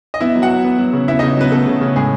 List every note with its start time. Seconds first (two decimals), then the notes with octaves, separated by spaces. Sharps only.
0.14 D#5
0.20 B3 E4 E5
0.35 F#3
0.42 F#4 F#5
0.50 F#3
0.64 B3
0.79 F#3
0.93 C#3
1.08 B3 E4 E5
1.19 C#3 D#4 D#5
1.37 F#3 B3 B4
1.52 C#3 A3 A4
1.67 C#3
1.81 C#3
1.96 A2 G#3 G#4